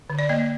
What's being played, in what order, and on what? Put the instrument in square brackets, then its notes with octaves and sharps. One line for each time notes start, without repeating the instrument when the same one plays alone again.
[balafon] D3
D5
A#3 D#5